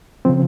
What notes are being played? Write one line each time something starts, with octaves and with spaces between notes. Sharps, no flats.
C#3 F3 C4